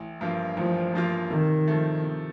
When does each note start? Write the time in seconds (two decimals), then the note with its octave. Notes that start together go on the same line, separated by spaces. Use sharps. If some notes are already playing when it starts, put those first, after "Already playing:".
Already playing: A1
0.21 G2 F3 A#3 F4
0.57 A1 F3
0.93 G2 F3 A#3 F4
1.30 C3 D#3
1.67 F3 A3
2.04 C3